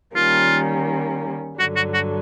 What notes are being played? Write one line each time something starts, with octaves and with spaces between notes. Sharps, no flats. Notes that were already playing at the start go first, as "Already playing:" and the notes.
D#3 G3 A#3 C#4 F4
G2 D3 F#3 F#4
F#4
F#4